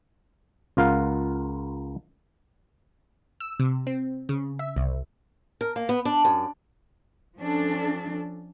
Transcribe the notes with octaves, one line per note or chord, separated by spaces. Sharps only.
C#2 F4 A#4 F5 F#5
E6
C3
C4
C#3
E5
C2
A#4
A#3
B3
D4
F#2
F3 C#4 D4 A4